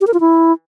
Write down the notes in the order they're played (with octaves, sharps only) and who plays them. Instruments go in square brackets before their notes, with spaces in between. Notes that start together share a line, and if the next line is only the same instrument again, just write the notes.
[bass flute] G4
A#4
F4
E4